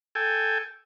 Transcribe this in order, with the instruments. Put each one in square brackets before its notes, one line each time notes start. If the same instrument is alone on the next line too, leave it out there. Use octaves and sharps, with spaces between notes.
[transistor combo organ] A4 G5 G#5